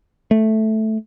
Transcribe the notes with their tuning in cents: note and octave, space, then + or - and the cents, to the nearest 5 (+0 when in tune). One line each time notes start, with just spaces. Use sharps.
A3 -5